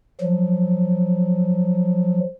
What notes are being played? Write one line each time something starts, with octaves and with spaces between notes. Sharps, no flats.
F3 F#3